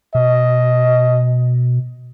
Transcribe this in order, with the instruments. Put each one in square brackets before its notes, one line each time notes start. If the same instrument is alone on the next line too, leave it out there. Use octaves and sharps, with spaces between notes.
[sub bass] B2 [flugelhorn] D#5